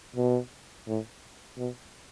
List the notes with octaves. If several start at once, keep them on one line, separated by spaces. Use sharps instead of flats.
B2
A2
B2